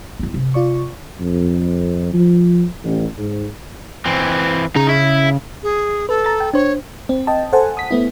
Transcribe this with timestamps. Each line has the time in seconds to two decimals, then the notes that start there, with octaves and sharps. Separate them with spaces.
0.19 B3 E4
0.34 C3
0.54 F4 D5 C#6
1.20 F2
2.13 F3
2.84 A1
3.18 G#2
4.05 E3 C4
4.76 C#3 D#4 A#5
4.89 E4
5.63 G#4
6.09 A4 B4
6.24 A#5 A6
6.40 G5
6.54 D4 C5 C#5
7.09 C4
7.27 D#5 G5 A5
7.53 A4 C5 F#5 G#5 A5
7.77 D#6 B6
7.91 A3 B3 E4